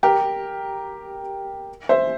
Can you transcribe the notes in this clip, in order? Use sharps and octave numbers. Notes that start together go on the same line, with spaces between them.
G4 A#4
C5 E5